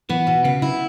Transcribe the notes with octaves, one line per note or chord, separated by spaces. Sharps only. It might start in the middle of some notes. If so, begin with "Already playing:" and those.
E3 B3
B2
C#3 B3
E4